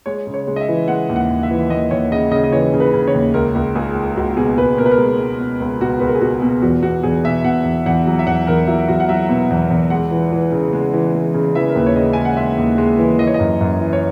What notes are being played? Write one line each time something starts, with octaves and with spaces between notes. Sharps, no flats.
G#3 C#5
C#3
C#5
G#3
D#5
E5
E3
G#3 F#5
D#2
F#5
D#2
E5
E3
D#2 D#5
D#2 C#5
C#3 D#5
C#3 D#5
D#5
E3 C#5
C#3
B4
C#3
C#5
D#2
C#2 A#4
C#2
C#2 G#4
G#3
C#2 F#4
B2 G#4
C#2 B4
B2 A#4
B4
A#4
G#3
G#3
B2
C#2
B2 F#4
C#2 B4
A#4
G#4
B2 F#4
B2
E2 F#4
B2 F#4
E2 G#4
B2 E5
B2 F#5
E2
E2 F#5
F#3
E5
E2 F#5
E2 A#4
F#3 E4
E2 F#4
F#5
F#3 E5
B2
E2
E2
G#3 F#5
E3
E3
C#3
G#3
E3
G#3
C#3
E3 E5
A#4
D#2 B4
C#5
C#3 D#5
G#3 G#5
F#5
G#3 E5
D#2
G#3
E3
E3 D#5
C#5
D#5
F#2
F#2
E3
C#5